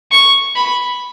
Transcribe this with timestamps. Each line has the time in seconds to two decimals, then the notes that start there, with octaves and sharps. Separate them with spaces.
0.12 C#6
0.56 B5